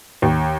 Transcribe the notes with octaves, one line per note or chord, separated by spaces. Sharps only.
D#2